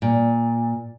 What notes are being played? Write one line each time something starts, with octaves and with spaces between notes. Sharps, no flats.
A#2